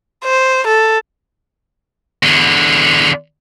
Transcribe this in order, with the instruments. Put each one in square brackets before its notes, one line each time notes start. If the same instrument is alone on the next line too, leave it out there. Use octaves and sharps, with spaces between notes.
[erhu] C5
A4
[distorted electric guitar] E2 D3